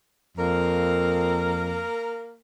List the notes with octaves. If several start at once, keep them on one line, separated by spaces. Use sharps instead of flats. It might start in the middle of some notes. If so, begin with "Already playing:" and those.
F2 A#3 A#4